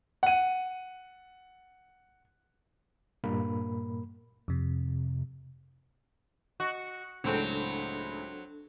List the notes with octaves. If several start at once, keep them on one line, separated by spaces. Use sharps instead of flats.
F#5 D#7
G2 A#2 A#3 A#4 B5
F2 C3
F#4 D#5
C#2 A2 F#3 C4 D4 A4